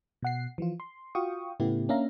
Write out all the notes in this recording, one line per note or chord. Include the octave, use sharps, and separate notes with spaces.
B2 F#5 C7
E3 F3 F4
C6
F4 F#4 F5 G5 C#6 D#6
A2 C#3 A3 B3 E4 G4
A#3 C#4 D4 E5 F5 A#5